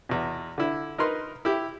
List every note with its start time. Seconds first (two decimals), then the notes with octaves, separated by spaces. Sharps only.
0.09 E2 B2
0.58 D3 E4
0.98 D#4 A#4 B4 C6
1.45 E4 G4